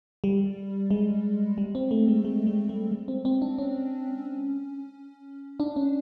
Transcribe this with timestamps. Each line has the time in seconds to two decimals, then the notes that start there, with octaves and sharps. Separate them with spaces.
0.24 G3
0.91 G#3
1.58 G3
1.75 C4
1.91 A3
2.08 G#3
2.25 G#3
2.47 G#3
2.69 A3
2.91 G#3
3.08 C4
3.25 C4
3.42 D4
3.58 C#4
5.60 D4
5.76 C#4